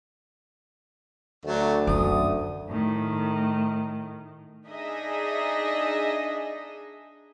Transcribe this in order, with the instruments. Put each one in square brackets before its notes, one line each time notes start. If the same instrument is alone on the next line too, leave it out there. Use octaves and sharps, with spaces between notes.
[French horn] D2 [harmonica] F#3 A3
[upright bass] F#2 D4 [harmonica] D#6
[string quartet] A2 D#3
[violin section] D4 D#4 G#4 D#5 E5